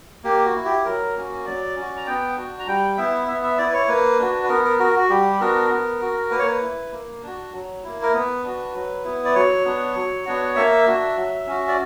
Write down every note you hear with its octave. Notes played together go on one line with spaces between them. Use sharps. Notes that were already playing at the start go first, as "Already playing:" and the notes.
A#3 G4
F#4
E4
G4
F#3 A#4
A#3 C#4 F#4
F#3 D5
C#4 F#4
A#5
B3 G5
D4 F#4
A#5
G3 G5
B3 E4 E5
B3 E5
E5
E4 D5
B4
C#5
A#3 B4
D4 F#4
B4
B3 A#4
A#4
F#4 A#4
F#4
G3 G4
B3 D4 F#4 A#4
B3
F#4
A#3 B4
C#5
B4
E4
A#3
D4 F#4
F#3
A#3 E4
A#4
B3 B4
D4 F#4
F#3
B3 E4
D5
F#3 C#5
B3 D4
F#3
B3 D4 F#4
A#3 E5
D4 F#4
F#3
C#4 F#4
D5